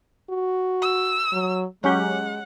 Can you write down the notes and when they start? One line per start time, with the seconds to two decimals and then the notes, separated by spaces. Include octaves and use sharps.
0.30 F#4
0.82 E6
1.32 F#3
1.84 F#3 G#3 C#4 G4 F#5